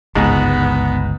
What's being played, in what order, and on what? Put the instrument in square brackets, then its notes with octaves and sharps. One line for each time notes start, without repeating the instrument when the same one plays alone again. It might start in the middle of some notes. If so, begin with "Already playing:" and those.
[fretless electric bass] G1 C#2 [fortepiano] G#2 [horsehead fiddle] B3